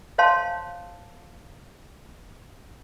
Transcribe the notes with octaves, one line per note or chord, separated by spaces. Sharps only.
C5 C#5 F5 A5 C6